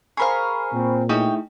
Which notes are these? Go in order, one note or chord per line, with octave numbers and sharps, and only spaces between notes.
G#4 A#4 C5 F5 B5 C#6
A#2 C4
A3 D#4 E4 G#4 C#5 G5 D#6